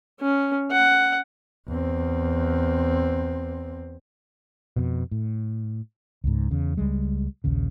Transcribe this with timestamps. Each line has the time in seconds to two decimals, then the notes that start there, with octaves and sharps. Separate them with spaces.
0.21 C#4
0.71 F#5
1.68 E2 C4
4.76 F2 B2
5.11 A2
6.24 C#2 G#2
6.51 E2 C#3
6.77 C#2 G3 G#3
7.44 A#1 D#2 C#3